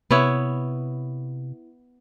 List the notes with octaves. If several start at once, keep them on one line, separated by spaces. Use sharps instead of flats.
C3 B3 E4 C#5